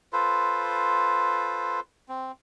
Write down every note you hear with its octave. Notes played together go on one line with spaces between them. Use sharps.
F4 A4 B4 C5
C4